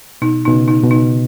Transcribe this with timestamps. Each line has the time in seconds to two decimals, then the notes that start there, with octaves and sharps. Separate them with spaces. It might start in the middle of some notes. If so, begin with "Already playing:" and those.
0.22 B2 D#4
0.45 B2 D#4
0.52 C#3
0.68 D#4
0.83 B2
0.91 D#4